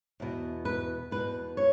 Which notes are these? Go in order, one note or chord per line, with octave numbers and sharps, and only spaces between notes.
E2 B2
B4
E2 B2 B4
C#5